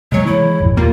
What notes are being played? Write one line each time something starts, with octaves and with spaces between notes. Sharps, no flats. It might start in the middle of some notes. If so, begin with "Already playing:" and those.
C3 F#3 G#3 A#3 C#5
E3 E4
G#1 F2 A#2
D#1 G3 A#3 F4